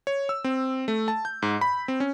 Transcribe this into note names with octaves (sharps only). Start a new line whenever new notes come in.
C#5
E6
C4
A3
A5
G6
G#2
B5
C4
C#4